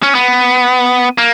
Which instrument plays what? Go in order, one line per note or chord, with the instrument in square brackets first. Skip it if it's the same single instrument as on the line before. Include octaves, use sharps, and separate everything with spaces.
[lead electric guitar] C#4
B3
A#3